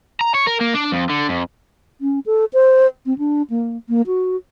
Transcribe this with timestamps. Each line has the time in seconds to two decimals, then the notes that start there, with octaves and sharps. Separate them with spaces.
0.21 A#5
0.35 C#5
0.47 A#4
0.61 A#3
0.75 D4
0.93 F2
1.10 D3
1.29 F2
2.01 C#4
2.26 A4
2.53 C5
3.06 C4
3.18 D4
3.50 A#3
3.89 A#3
4.07 F#4